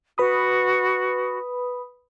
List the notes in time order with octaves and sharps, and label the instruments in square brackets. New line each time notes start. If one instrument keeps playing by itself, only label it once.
[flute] F#4 [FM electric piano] B4 B5 D#6